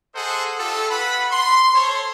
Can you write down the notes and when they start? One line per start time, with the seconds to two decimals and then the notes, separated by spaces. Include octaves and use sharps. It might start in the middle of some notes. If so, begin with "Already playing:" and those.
0.15 G#4 A4 C5 D#5 F#5
0.59 F4 G4 A4
0.90 B4 F#5 B5
1.31 C6
1.75 A4 C5 C#5